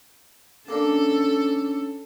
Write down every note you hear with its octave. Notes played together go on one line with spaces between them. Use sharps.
A#3 C#4 D4 A4